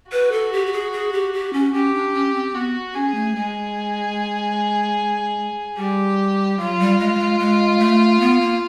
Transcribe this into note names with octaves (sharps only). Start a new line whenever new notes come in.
F#4 B4
A4
G4
G4
G#4
G#4
G4
G4
C#4
C#4 G4
D4
C#4
C4
B3 F#4
C#4 G#4
A3
G#3 G#4
G3 G4
F#3 F4
G3
G#3
G3
G#3
G#3
A3
B3
A#3